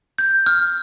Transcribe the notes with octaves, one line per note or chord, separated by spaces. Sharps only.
G6
F6